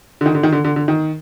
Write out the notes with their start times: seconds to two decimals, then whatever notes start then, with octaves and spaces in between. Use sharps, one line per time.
0.21 D3
0.26 D#3
0.35 D3
0.43 D#3
0.52 D3
0.64 D3
0.76 D3
0.88 D#3